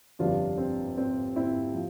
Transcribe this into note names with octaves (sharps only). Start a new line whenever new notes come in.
G1 F2 C3 F3 D4 F4
C4
C4
C4 E4
F3